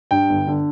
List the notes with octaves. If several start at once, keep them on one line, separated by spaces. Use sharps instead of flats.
G2 G5
G1
D3